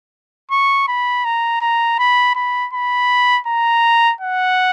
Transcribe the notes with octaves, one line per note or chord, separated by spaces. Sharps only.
C#6
B5
A#5
A#5
B5
B5
B5
A#5
F#5